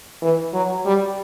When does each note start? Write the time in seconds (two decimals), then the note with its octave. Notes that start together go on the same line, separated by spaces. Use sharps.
0.22 E3
0.54 F#3
0.85 G3